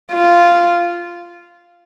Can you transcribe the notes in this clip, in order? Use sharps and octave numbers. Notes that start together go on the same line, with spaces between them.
F4